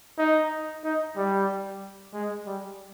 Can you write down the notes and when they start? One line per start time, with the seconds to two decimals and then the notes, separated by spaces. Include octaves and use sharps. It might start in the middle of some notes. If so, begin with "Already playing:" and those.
0.18 D#4
0.84 D#4
1.16 G3
2.14 G#3
2.46 G3